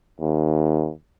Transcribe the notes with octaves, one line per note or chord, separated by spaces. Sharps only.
D#2